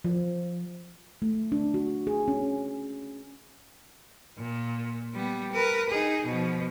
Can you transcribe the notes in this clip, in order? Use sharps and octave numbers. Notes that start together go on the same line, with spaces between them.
F3
A3
D4
F#4
G#4
C#4
A#2
G3 B3
A#4 B4
D#4 G#4
B2 F3